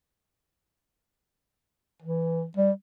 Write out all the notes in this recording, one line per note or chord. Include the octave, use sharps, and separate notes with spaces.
E3
G3